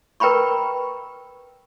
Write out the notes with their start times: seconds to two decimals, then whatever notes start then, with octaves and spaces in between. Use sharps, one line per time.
0.20 A#4 B4 G5 A#5 B5 C#6